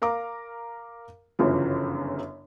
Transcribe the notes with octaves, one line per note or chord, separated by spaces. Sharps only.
A#4 F5 A#5 D6
G1 F#2 C#3 E3 F3